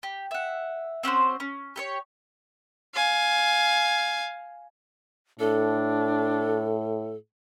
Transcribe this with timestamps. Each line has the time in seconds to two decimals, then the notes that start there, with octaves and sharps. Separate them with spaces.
0.03 G4
0.31 E5 F#5
1.03 C4 C#4 F#4 C5
1.40 C#4
1.76 G4 A4 C#5
2.94 F5 G#5
5.40 A2 D4 A4